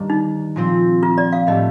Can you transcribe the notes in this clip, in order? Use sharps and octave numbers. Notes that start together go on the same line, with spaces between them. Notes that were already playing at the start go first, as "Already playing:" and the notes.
Already playing: G2 D#3 A#3 D4
D#4
A#2 F3 C4
F4
D5
F5
A2 A3 D4 G4 D#5